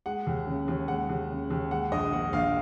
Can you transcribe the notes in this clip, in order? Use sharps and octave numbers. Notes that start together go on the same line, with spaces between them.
G#3 F#5
D#2
C#3
D#2
G#3 F#5
D#2
C#3
D#2
G#3 F#5
A#1 D#5
A#2 F#5
A#1 F5